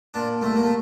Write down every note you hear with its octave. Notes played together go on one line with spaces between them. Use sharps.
A#2 D4
C2 A3
A#3
A3